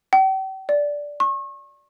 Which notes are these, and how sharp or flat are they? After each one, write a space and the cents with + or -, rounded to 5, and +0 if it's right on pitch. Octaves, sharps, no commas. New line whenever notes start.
G5 -40
D5 -10
C#6 -35